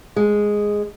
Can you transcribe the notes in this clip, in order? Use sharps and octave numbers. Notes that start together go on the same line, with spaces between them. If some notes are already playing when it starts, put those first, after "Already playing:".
G#3